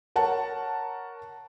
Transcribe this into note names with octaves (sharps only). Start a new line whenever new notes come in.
A#4 C#5 F#5 A5